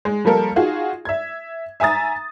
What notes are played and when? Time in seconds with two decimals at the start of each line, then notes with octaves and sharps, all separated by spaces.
0.05 G#3
0.25 F3 G3 A#3 A4 A#4
0.56 D#4 F4 F#4 G#4
1.05 E5 G#6
1.80 E5 G#5 A#5 D#6 A6